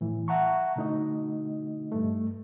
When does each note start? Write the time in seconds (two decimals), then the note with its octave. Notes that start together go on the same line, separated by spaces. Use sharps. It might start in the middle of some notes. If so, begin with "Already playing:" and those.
0.01 A2 E3
0.28 E5 F#5 A5 A#5 C#6
0.76 B2 D3 A3 D#4 F#4 D#5
1.92 G2 A3